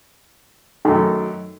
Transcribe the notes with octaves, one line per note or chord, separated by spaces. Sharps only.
F#2 D#3 A3